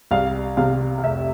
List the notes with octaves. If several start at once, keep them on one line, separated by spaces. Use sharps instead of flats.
C2 F5
C3 F5
F5
F1 E5